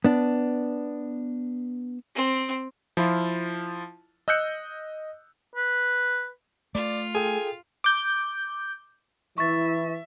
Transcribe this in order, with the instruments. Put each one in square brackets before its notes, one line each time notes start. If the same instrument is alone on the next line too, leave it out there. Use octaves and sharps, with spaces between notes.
[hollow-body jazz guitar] B3 D4
[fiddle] C4
[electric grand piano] F3 E4 F4
D#5 E6 F#6 G6 C#7
[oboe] B4
[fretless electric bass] A3 [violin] F4 [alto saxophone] D5
[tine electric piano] G#4 A4 G5 [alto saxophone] G#5
[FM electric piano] D6 G6
[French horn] E3 [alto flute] E4 [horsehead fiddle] E5 [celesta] C#6 A6